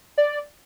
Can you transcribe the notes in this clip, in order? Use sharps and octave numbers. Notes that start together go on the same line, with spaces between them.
D5